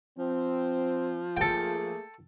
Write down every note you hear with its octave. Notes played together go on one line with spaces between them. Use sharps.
F3 C4
A3 A#3 G#4 A4 G5